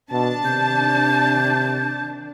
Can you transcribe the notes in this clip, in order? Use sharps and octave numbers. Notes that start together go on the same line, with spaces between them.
B2 D#3 D4 A5
C3 G6